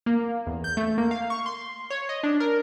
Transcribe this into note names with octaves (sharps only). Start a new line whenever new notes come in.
A#3
E2
G6
A3
A#3
F5
C#6
C6
C#5
D#5
D4
A#4